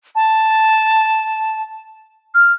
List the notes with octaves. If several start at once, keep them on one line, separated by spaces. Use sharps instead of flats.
A5
F6